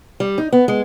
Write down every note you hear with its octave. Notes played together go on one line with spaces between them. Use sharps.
G3
D#4
B3
G#3